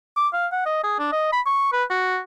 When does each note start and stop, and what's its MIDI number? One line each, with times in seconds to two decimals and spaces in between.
0.17 0.28 86
0.33 0.47 77
0.52 0.64 78
0.66 0.83 75
0.83 0.94 68
0.99 1.11 62
1.12 1.31 75
1.33 1.41 83
1.46 1.69 85
1.73 1.84 71
1.90 2.18 66